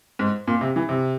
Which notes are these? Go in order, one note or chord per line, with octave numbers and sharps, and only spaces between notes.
G#2
A#2
C3
E3
C3